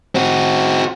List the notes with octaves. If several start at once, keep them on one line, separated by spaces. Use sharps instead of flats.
C4 F#4